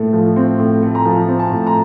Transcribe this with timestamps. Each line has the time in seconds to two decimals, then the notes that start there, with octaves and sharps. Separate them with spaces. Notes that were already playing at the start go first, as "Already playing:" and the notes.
Already playing: A2 A3
0.13 F3
0.36 C4
0.59 A2
0.82 A3
0.95 A#5
1.05 F3 A5
1.28 C4
1.39 A5
1.52 A2
1.67 A#5